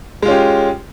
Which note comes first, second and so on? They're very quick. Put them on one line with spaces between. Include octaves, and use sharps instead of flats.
G#3 F4 C#4 G4